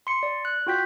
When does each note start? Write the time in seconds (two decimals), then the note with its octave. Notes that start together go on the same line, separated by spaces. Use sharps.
0.07 C6 C#7
0.23 D5
0.45 F#6
0.67 F4 F#4 G5 G6 B6